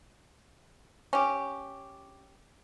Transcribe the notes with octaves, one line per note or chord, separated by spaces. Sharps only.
C#4 G4